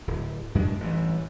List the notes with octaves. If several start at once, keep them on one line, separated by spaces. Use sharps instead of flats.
D1
F#2 G#3 C#4 D4
A1 G2 E3